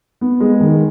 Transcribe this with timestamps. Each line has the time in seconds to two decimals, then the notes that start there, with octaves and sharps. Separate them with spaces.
0.21 B3
0.40 G#3
0.60 D#3